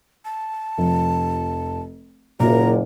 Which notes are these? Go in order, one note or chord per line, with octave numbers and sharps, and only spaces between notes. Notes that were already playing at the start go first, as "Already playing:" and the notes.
A5
F1 F3
F#1 A#2 A#3 A#5